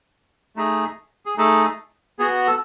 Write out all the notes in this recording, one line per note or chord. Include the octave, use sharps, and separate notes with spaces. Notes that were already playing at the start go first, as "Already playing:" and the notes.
A3 D#4 G#4
G#4
A3 D#4 G#4 A4
B3 F#4 G#4
A4